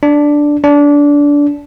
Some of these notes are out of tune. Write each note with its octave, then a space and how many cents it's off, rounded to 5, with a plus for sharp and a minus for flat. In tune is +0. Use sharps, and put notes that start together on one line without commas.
D4 +0
D4 -20